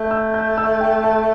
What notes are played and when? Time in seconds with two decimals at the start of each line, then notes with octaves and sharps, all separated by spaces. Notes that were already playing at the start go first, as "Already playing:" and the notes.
Already playing: A3 G6
0.11 E6
0.34 G6
0.58 E6
0.81 G5
1.04 A5